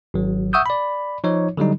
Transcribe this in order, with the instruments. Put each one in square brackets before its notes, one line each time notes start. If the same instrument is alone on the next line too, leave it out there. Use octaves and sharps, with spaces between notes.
[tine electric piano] G#1 F#3
E5 F#5 C#6 D#6 E6 G6
D5 B5
F3 D#4 C#5
D3 F#3 G3 D#4